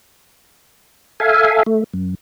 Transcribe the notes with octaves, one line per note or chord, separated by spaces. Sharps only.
A4 E5 F5 G#5
A3
F#2